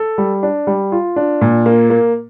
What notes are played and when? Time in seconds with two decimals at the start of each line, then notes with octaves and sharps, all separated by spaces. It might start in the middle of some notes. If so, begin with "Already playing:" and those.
Already playing: A4
0.18 G3
0.43 D4
0.67 G3
0.92 F4
1.16 D4
1.41 A#2
1.66 A#3
1.90 A#3